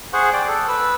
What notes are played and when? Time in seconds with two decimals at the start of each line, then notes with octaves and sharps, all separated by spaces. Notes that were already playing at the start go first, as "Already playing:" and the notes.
0.13 G#4 C5 F#5 C#6
0.33 D5 G5
0.48 A4
0.68 B4 E6